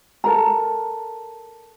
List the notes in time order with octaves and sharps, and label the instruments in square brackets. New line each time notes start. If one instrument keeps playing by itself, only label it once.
[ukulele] A4 A#4 A#5